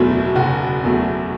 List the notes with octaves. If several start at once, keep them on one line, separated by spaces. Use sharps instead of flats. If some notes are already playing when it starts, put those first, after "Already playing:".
Already playing: F#1 E2 B2 F#3 A3
F#1 F#4
E2 B2 F#3 A3